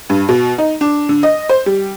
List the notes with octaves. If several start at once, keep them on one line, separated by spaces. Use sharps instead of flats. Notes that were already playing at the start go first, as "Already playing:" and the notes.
G2
B2
D#4
D4
D3
D#5
C5
G3